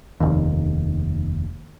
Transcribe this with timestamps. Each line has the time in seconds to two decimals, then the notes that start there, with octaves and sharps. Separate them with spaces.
0.20 F1 D#2